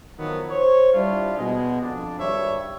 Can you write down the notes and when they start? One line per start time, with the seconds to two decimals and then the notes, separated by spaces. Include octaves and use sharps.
0.18 D#3 F3 F#3 B3
0.50 C5 C#5
0.92 G3 D4 E4 F4
1.38 B2 G#3
1.81 F2 D4
2.19 G#1 G2 C#5 E5